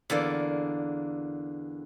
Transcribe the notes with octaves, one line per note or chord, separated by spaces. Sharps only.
E2 D3 A#3 D5